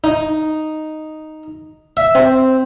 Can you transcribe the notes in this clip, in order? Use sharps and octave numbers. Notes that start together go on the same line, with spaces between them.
D#4
E5
C4